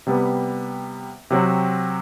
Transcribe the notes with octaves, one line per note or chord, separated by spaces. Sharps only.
C3 G3 B3
C3 F#3 C4 F#4